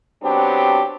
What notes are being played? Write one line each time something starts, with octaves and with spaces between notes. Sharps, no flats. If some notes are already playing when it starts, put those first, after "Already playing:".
F#3 B3 C4 D4 G4